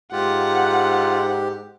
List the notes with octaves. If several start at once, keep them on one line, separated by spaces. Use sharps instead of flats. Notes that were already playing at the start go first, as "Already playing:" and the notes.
G#2 F4 G4 F#5